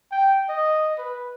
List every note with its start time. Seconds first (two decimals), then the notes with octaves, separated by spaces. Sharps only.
0.11 G5
0.49 D#5
0.98 B4